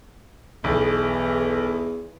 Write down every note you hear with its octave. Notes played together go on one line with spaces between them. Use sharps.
B1 E2 E3 G#4